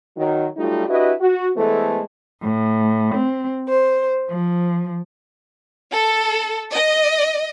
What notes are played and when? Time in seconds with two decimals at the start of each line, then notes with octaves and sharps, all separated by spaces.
0.16 D#3 F#3
0.57 F#3 G3 A3 D#4 F4
0.88 D4 E4 F#4 G4 B4 D#5
1.19 F#4
1.57 E3 G#3 A3 B3 A4 C5
2.41 A2
3.15 C4
3.68 C5
4.30 F3
5.92 A4
6.72 D#5